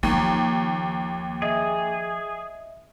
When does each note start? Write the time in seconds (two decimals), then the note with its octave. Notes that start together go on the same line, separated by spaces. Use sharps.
0.03 D#2 F3 A#3 A#5
1.42 G#4 D#5 E5